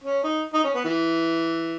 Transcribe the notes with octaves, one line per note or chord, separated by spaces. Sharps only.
C#4
D#4
D#4
C#4
B3
E3